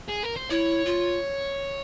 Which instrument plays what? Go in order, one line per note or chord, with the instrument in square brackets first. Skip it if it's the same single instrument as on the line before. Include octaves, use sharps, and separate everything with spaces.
[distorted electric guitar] G#4
A#4
C5
[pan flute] E4 [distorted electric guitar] C#5
[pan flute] F4